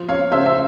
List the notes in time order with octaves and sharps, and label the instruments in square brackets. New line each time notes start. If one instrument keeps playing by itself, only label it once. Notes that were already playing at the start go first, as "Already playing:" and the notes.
Already playing: [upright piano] F3
C#5 F5
C#3 C5 E5
E5